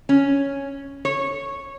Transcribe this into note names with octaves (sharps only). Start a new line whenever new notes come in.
C#4
C#5